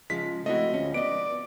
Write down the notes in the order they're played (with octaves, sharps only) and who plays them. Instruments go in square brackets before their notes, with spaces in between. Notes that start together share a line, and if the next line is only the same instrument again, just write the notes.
[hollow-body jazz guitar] C#3 F3 G#3 [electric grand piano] B6
[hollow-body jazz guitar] A3 C4 F#4 [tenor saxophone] E4 [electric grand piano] D#5
[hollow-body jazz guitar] D2 G#3 C#4 [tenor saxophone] F3
[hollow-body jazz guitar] B3 D#5 [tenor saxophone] D5 [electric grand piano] D7